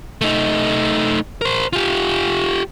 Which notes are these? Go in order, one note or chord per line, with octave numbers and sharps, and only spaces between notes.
A3 D#4
A#4 C5
F4 G4